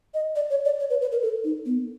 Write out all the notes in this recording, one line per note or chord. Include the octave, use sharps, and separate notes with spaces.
D#5
D5
C#5
D5
C#5
B4
B4
A#4
A4
D#4
B3